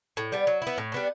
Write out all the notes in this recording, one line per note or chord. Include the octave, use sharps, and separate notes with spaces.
A2
G3 B3
F#3
B3 E4
A2
G3 B3 D4